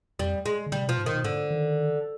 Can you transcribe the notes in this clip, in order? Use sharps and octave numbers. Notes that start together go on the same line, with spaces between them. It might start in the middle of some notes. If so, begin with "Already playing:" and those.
F2 G3
G#3
D3
G3
C3
B2 F3
G#2
D#3
B2
G#2 D3
D#3